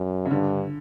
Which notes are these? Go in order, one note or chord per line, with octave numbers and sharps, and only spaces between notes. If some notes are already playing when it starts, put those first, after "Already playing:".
Already playing: F#2
C#3
G2 D3